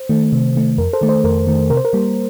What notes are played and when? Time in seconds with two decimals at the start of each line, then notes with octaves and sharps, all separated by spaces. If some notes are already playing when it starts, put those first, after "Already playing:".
Already playing: C5
0.09 D#3 A3
0.32 C3
0.56 D#3 A3
0.78 F2 A#4
0.93 A4 C5
1.01 D#3 A3
1.08 A4 C5
1.24 F2 A#4
1.47 D#3 A3
1.70 C3 A#4
1.77 C5
1.85 A#4
1.93 G3 A#3